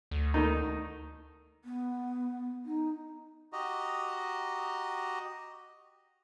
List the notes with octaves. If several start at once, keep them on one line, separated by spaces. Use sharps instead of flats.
D2
D#3 A3 D#4
B3
D#4
F#4 G4 D#5 A#5